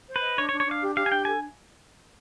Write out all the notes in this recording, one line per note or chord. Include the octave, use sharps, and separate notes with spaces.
C5
B4
D#5
D4 C#5
C#5
D4
C#5
D4 F5
G4
G4 F5
G#5
D4 G5
A4 G#5